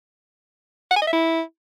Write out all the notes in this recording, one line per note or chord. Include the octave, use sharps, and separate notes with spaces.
F#5
G#5
D#5
E5
E4